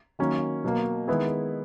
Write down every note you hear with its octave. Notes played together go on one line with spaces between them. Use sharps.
D#3 F#3 A#3 C#4
B2 F#3 A#3
D#3 G#3 B3 E4 G#4